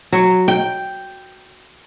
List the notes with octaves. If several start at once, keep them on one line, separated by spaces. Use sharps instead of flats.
F#3
G5